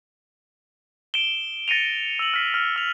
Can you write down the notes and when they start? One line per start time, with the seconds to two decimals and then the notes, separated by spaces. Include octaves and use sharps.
1.14 D7 E7 G7
1.68 A6 A#6 C#7 D#7 F7
2.19 E6 F#7
2.34 F6 B6 C7
2.54 F6
2.76 E6 F7